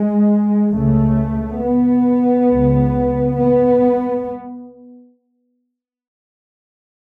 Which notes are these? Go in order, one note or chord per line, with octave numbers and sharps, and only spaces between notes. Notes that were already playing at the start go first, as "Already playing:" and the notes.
Already playing: G#3
C#2 C#3 A3
B3
C#2 C#3
B3